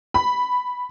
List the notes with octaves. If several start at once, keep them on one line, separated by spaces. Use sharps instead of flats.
B5